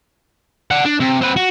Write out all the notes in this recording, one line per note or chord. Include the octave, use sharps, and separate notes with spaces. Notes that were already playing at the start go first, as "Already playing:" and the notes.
D5 F#5
D4
C3
C4 B4
F#4